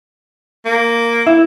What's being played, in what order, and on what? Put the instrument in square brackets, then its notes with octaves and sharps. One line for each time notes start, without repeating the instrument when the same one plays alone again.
[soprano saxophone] A#3
[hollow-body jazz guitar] E4